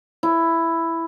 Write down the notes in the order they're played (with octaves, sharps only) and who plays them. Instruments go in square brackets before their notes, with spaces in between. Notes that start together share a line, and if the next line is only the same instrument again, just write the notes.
[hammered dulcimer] E4